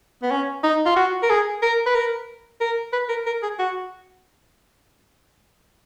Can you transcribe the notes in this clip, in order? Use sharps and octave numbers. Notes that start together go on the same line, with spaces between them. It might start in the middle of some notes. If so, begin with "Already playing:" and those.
B3
C#4
D#4
F4
F#4
A#4
G#4
A#4
B4
A#4
A#4
B4
A#4
A#4
G#4
F#4